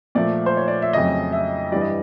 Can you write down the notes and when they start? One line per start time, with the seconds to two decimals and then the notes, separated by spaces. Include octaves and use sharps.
0.15 A#2 F3 A3 D5
0.46 C5
0.57 C#5
0.68 D5
0.82 E5
0.93 F2 C#3 F#3 A3 D#5
1.32 E5
1.72 G2 E3 G3 D5
1.81 D#5